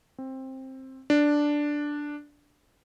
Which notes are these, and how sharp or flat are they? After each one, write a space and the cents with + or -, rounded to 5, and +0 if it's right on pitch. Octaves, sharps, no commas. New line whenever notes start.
C4 +15
D4 +0